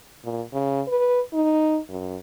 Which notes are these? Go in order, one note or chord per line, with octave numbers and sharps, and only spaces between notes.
A#2
C#3
B4
D#4
F#2